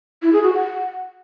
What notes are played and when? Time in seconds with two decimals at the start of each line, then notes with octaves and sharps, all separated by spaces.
0.22 E4
0.33 G#4
0.43 F#4
0.53 F#5